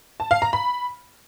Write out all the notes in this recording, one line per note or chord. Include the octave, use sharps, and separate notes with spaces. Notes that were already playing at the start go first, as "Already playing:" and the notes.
A5
F5
A#5
B5